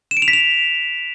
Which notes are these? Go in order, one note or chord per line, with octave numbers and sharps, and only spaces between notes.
E7
D7
F7
B6
F7